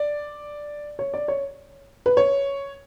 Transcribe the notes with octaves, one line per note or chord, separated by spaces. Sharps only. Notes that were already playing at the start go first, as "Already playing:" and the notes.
Already playing: D5
C#5
D5
C#5
B4
C#5